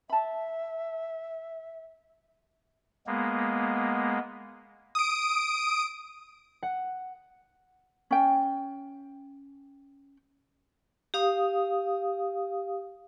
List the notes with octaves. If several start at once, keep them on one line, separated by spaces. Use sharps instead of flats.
E5 A5 B5
G#3 A#3 B3
D#6 D7
F#5
C#4 G5
G4 F5 D#6